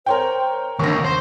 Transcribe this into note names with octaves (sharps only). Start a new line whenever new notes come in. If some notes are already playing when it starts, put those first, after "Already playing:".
A#4 C5 C#5 G5
D#2 D3 A#4 C#6 A#6
C5